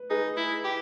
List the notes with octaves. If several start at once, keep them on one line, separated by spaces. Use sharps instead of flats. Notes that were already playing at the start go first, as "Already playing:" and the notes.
Already playing: B4
D#4 G#4 B4
E4
G4